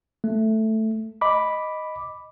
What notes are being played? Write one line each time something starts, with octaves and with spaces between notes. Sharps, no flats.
A3
D#5 B5 D6